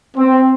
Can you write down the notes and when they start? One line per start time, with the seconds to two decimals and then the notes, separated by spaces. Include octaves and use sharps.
0.17 C4